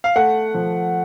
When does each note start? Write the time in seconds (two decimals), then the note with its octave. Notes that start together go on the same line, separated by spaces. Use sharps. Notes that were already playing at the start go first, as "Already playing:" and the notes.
0.04 F5
0.16 A3 F#5
0.55 F3